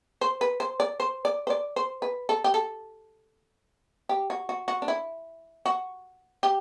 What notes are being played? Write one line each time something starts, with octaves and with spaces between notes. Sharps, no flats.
C5
B4
C5
D5
C5
D5
C5
D5
C5
B4
A4
G4
A4
G4
F#4
F#4
F#4
D4
E4
F#4
G4